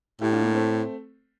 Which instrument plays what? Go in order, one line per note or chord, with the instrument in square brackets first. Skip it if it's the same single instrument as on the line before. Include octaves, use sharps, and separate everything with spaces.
[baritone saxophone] A2 [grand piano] E4 G4
[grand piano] D4 F4
A#3 D4
A3 C4